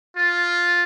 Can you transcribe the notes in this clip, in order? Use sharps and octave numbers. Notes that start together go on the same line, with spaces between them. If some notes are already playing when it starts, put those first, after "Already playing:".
F4